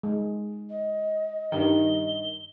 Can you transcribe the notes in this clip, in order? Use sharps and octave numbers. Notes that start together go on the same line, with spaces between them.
G#3
D#5
G2 D#3 G7